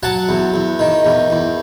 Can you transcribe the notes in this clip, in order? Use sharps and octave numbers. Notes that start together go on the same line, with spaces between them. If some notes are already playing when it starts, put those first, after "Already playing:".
F#3 F#5 A5
E2
E2
D#3
E2
E2